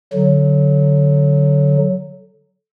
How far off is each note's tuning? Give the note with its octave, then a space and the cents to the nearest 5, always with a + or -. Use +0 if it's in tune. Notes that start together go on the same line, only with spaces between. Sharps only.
D3 -10 F#3 +0